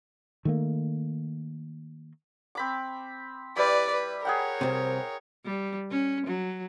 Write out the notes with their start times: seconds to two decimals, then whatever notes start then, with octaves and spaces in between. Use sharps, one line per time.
0.45 D#3 A3 A#3
2.55 C4 B5 D6
3.56 G3 E4 B4 D5 B5
3.93 B4
4.25 G#4 A#4 C#5 F#5 G5
4.61 C2 F#2 C3
5.45 G3
5.91 C#4
6.27 F#3